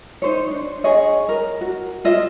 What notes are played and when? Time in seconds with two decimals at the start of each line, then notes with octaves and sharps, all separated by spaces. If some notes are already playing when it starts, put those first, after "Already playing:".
0.22 D#4 C5 C#5
0.51 D4
0.84 G#4 C#5 D#5
1.29 A#4
1.61 F#4
2.05 F4 D#5 E5